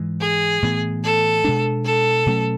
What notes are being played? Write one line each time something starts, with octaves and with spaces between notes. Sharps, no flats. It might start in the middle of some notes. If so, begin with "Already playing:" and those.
Already playing: G#2 E3 G#3
G#4
A2 E3 B3
A4
B2 G#3 D4
A4
B2 F#3 A3 C#4